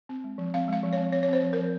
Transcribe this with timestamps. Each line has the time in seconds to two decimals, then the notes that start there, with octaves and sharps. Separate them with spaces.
0.09 C4
0.24 G#3
0.38 F3
0.54 C4 F5
0.68 G#3 F5
0.83 F3
0.93 C4 C#5
1.13 C4 C#5
1.23 C#5
1.28 C4 C5
1.43 F3
1.53 A#4
1.58 F3